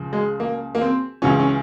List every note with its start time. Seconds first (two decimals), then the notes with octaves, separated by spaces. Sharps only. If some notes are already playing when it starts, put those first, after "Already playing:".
Already playing: C#2 C#3 F3
0.13 G#3
0.40 A#3
0.75 A#3
0.81 C4
1.22 C#2 C#3 E3 C#4
1.39 C#4